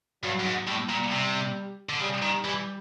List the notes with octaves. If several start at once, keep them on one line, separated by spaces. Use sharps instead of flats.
G2 F#3
G2
G#2
A2 G3
A#2
C3
D3
C#3 G3
D#3
E3 G3